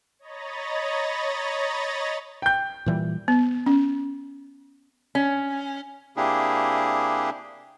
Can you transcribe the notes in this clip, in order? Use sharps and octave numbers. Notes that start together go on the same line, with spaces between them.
C#5 D#5 A#5 B5 A6
G5 G6
A#2 E3 G3
B3
C#4
C#4
C3 A#3 D4 E4 G4 G#4